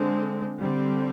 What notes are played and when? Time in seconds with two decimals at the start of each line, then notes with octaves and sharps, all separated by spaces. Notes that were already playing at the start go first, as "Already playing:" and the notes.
Already playing: D3 G#3 C4
0.60 D3 G3 C4